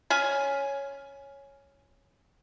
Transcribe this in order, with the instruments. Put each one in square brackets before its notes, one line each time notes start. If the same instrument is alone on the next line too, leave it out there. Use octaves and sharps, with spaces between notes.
[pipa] C#4 G#5